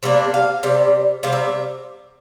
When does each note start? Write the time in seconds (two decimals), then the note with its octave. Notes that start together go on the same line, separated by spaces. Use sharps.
0.03 C3 G3 A#3 D4 D5
0.34 F5
0.63 C3 G3
1.23 C3 G3 F5
1.33 E5